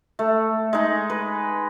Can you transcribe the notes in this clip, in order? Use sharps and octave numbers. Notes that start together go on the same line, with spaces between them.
A3
G#3 D#4
B4